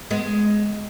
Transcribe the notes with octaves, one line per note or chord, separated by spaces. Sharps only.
G#3 B3